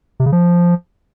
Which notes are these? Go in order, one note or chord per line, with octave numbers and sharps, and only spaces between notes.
C3
C#3
F3